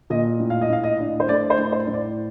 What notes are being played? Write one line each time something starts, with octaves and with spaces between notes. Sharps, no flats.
A#2 D#5
A2
F5
D#5
A2 F5
D#5
D4
C5
A3 D5
C5
A2
C5
A2
D5